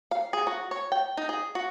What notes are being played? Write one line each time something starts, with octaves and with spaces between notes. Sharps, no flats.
F5
G#4
F#4
C#5
G5
D#4
G#4
F#4